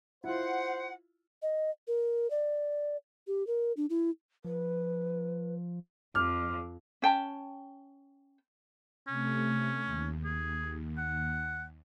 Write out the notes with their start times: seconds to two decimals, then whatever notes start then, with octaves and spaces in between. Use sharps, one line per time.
0.24 E4 F4 C5 F#5
1.42 D#5
1.88 A#4
2.31 D5
3.27 G4
3.47 A#4
3.77 D4
3.90 E4
4.45 F3 B4
6.15 F2 D6 F6
7.02 C#4 G5 A5
9.08 C3 A3 C#4
9.86 D#2
10.24 G#4
10.98 F#5